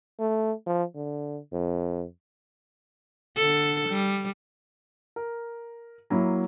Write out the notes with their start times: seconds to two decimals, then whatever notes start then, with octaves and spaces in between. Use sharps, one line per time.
0.20 A3
0.66 F3
0.95 D3
1.53 F2
3.36 D3 A4
3.89 G3
5.16 A#4
6.10 F#3 A#3 E4